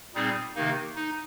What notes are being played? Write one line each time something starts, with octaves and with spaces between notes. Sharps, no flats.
A#2 G3 C4 D#4 G#4
C3 D#3 A#3 D#4
D#4